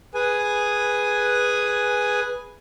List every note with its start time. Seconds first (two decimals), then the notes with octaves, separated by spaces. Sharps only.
0.14 G#4 B4 G#5